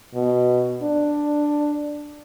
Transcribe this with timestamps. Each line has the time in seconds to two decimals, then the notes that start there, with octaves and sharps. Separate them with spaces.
0.14 B2
0.83 D4